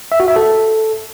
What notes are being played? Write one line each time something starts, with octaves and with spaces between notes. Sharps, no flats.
E5
F#4
E5
A4